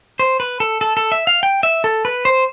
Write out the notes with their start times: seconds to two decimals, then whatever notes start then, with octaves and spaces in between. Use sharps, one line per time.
0.19 C5
0.40 B4
0.60 A4
0.81 A4
0.97 A4
1.12 E5
1.27 F5
1.43 G5
1.63 E5
1.84 A4
2.05 B4
2.25 C5